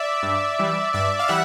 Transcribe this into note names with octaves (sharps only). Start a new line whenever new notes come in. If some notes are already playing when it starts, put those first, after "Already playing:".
Already playing: D5 E5
G2
E3 G3
G2 D5 E5
F5
E3 G3 E5 F#5